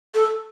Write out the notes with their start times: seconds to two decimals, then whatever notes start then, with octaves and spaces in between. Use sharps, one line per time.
0.15 A4